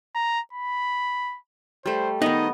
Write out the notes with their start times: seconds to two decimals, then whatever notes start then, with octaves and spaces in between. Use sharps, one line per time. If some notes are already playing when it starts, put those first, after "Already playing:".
0.15 A#5
0.53 B5
1.86 G3 A3 C5
2.22 D#3 B3 D#4 D#5